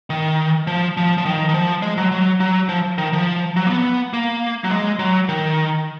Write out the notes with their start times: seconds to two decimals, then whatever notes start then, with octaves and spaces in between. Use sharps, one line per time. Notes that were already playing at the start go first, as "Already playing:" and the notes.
0.10 D#3
0.67 F3
0.97 F3
1.18 F3
1.26 D#3
1.49 D#3
1.54 F3
1.82 G#3
1.97 F#3
2.12 F#3
2.40 F#3
2.69 F3
2.98 D#3
3.13 F3
3.56 F#3
3.66 A#3
3.70 B3
4.13 A#3
4.64 F#3
4.71 G#3
4.99 F#3
5.29 D#3